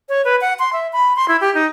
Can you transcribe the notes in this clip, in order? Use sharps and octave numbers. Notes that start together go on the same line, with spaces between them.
C#5
B4
F#5
C6
E5
B5
C6
E4
G4
D#4